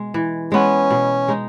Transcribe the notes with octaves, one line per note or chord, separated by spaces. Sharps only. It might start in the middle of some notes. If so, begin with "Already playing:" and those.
Already playing: B2 G#3
E3
G#3 B3 C#4
B2
G#3 D#4